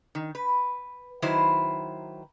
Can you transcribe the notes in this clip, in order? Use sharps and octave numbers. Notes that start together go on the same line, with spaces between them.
D#3
B4
D#3 F#3 E4 B4 C5